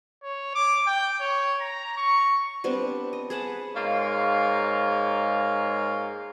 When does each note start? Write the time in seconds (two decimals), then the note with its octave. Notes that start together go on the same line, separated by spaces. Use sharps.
0.23 C#5
0.55 D6
0.87 G5
1.20 C#5
1.61 A#5
1.97 C#6
2.64 G3 B3 C4 D4
3.13 D#5
3.30 G#4 B4 F#5 A5
3.75 G#2 A#3 F4 C#5